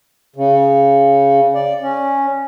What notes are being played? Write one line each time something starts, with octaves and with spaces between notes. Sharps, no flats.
C#3
D5
C#4